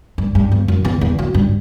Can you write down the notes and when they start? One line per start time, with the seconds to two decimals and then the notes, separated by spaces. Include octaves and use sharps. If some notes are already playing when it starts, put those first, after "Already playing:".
0.18 G2
0.35 G2
0.52 E2
0.68 F#2
0.85 E2
1.01 E2
1.19 F#2
1.34 G2